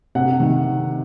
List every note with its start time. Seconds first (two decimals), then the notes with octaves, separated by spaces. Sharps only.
0.15 C3 F#5
0.40 D#3